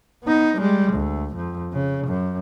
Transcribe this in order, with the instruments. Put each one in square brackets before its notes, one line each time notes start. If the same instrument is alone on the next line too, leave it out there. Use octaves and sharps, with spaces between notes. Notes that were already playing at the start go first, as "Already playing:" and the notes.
[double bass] B3 D#4
G3 G#3
D2
F2
C#3
F#2